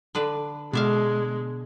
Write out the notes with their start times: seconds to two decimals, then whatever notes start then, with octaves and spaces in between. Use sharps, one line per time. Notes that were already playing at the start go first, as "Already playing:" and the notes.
0.15 D3 D4 B4
0.73 B2 G#3 D4 E5 F5